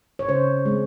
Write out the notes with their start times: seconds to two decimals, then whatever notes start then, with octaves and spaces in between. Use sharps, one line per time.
0.19 C#5
0.29 C#3 C5
0.65 G#3 C4